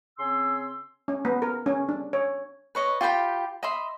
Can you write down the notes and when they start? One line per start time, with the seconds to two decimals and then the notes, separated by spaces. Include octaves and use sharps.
0.18 C#3 C4 G#5 C6 E6
1.08 C#4
1.25 B3
1.42 A#4
1.66 C#4
1.89 D4
2.13 C#5
2.75 B4 C#5 D#5
3.01 F4 G4 G5 B5
3.63 D#5 E5 B5 C6